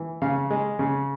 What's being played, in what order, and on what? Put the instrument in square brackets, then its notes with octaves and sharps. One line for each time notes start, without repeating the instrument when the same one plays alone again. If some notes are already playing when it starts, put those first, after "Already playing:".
Already playing: [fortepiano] E3
C#3 F5
G#3
C#3